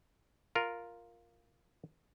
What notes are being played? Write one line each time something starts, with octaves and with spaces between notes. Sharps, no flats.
F4 A#4